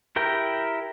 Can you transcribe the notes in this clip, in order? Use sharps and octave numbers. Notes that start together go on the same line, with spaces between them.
E4 G4 A#4 G5